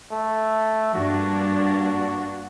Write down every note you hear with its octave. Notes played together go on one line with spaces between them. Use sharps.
A3
G2 A#3 D4 F#4